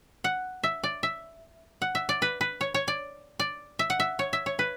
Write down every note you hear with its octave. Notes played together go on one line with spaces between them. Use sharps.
F#5
E5
D5
E5
F#5
E5
D5
B4
B4
C#5
C#5
D5
D5
E5
F#5
E5
C#5
E5
C#5
B4